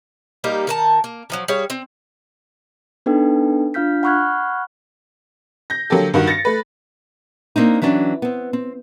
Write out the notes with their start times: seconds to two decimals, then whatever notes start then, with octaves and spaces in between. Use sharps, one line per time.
0.44 G3 A#3 D#4 G4
0.67 D#3 A#4 A5
1.04 A#3
1.30 D#3 F3 F#3
1.48 G3 G#4 C#5 F5
1.70 C4
3.06 B3 D4 D#4 A4 B4 G5
3.74 D4 F4 F5 F6 G6 B6
4.03 F#5 B5 C#6 F6 F#6 G#6
5.70 G6 A#6
5.90 D3 F#3 A#3 G4 A4
6.14 G2 D#3 F#4
6.27 A6 A#6 C#7
6.45 A3 B4
7.56 A#3 C4 D4 D#4
7.82 E3 F#3 C#4 D4
8.22 B3 C4
8.53 C4